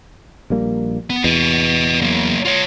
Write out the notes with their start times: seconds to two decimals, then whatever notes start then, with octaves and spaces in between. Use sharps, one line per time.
0.50 A#1 G3 A#3
1.10 B3
1.24 E2 B4 D#5
2.01 F#3 A#3
2.45 F4 C#5